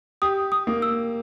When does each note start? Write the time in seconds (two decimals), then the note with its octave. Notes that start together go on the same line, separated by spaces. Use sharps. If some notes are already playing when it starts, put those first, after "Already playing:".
0.22 G4 D#6
0.52 D#6
0.67 A#3
0.82 E6